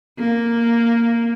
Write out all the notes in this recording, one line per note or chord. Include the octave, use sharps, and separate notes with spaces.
A#3